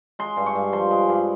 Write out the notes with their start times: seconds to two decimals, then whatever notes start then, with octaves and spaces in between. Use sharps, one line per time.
0.19 G#3 C6
0.37 G2
0.46 C#6
0.55 G2
0.72 F3 C6
0.91 G#3
1.09 G2